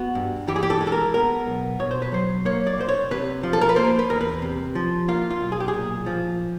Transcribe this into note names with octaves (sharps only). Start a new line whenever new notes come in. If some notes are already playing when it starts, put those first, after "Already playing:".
Already playing: B3 F#4
G2
E3 G4
G#4
G4
A4
G#3
A4
A#4
B3 A#4
B1
B2 C#5
C5
B4
F#3 C5
A#3 C#5
D5
C2 C5
C#5
C3 B4
F3
A4
A#4
B4
A#3 C5
B4
E2 A#4
B4
C3
F3
A#3 F4
F4
B1
G#4
G4
G#4
A#2
F3